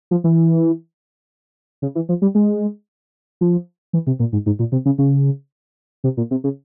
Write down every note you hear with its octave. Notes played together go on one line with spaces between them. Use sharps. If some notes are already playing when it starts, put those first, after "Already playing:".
F3
E3
C#3
E3
F3
G3
G#3
F3
E3
C3
A#2
G#2
G#2
A#2
C3
C#3
C#3
C3
A#2
C3
C#3